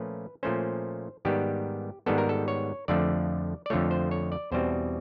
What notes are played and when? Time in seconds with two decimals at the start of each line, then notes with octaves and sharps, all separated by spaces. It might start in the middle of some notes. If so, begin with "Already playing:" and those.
Already playing: A#2 F3 A3 C#4 B4
0.43 A#2 F3 A3 C#4 C5
1.25 G#2 D#3 G3 B3 G4
2.06 G#2 D#3 G3 B3 A4
2.18 A#4
2.29 A4
2.48 C#5
2.88 F2 D3 F3 A3 D5
3.66 D5
3.70 F2 D3 F3 A3 C#5
3.91 C5
4.11 C#5
4.32 D5
4.52 E2 B2 G3 C4 C5